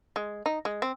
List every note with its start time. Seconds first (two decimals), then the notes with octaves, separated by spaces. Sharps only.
0.16 G#3
0.46 D#4
0.65 G#3
0.82 C4